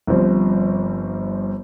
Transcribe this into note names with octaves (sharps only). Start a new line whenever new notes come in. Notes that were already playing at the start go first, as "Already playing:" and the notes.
G1 G2 F3 C4